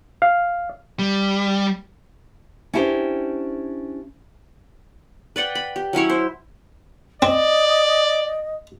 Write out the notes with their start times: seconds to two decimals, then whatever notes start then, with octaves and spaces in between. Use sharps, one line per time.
0.22 F5
0.99 G3
2.74 C#4 D4 E4 G4 B4 C5
5.36 B4 D5 F#5 G5
5.55 B5
5.76 G4
5.93 F#3 C#4 E4 C#5
6.10 C5
7.22 C4 D5 D#5